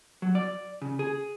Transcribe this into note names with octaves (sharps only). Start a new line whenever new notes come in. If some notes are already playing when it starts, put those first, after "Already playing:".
F#3
D5
C#3
G#4